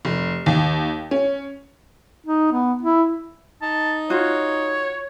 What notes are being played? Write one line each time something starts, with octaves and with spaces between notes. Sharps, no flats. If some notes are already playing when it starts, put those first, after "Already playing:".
F1
D#2
C#4
D#4
B3
E4
D#4 A5
F4 F#4 C#5